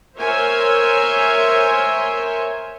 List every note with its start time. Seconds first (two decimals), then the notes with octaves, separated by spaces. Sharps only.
0.18 A#4 C5 C#5 E5 G#5 C6